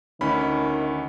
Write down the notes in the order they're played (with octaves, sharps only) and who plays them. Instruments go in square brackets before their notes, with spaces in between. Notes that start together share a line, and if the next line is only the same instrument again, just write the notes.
[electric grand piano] D2 C#4 B5 [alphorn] D#3